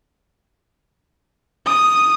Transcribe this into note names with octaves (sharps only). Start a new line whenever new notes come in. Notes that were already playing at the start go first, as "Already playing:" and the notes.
D#6